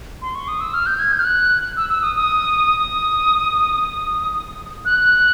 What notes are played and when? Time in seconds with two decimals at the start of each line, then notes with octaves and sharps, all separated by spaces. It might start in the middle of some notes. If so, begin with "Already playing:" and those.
0.22 C6
0.35 C#6
0.48 D#6
0.60 E6
0.74 F6
0.86 G6
0.99 G#6
1.12 G6
1.20 F6
1.25 F#6
1.77 E6
1.90 E6
2.02 D#6
2.16 D#6
2.80 D#6
4.85 F#6